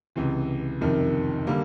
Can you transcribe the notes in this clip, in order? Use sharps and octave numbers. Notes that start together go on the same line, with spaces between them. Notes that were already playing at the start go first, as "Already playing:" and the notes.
C#2 C3 E3
F#1 F2 C3 D#3
D3 G3 A#3